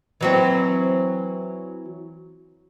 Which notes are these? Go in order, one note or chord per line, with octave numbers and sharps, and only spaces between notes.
E3 F#3 C4